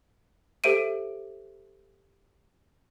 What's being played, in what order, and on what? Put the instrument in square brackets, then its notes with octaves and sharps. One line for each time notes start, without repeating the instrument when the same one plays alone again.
[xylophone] G4 A4 C5 E5 D7 D#7